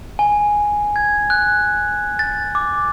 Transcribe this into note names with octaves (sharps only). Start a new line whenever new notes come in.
G#5
G#6
F#6
A6
D6